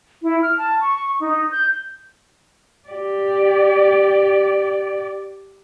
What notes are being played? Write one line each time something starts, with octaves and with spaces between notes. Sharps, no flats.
E4
F6
A5
C#6
D#4
G6
G4 D5